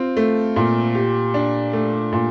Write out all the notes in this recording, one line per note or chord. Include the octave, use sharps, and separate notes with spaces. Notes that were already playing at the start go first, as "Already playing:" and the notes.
Already playing: C4 F4
A3
A#2
G4
D4
A3
A#2